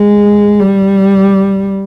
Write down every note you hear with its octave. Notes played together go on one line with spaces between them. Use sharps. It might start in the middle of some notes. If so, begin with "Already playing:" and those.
Already playing: G#3
G3